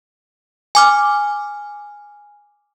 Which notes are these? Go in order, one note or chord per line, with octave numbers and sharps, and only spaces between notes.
G#5 D6 F6